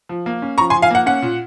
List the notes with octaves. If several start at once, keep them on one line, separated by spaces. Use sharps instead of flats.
F3
A#3
C#4
F3 A#5 C#6
G#5 C6
F3
F5 G#5
A#3 F#5
C#4 F#5
A#2